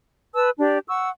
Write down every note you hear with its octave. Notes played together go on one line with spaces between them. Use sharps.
B4 A5 E6
D4 G4 D5
F#5 C#6 E6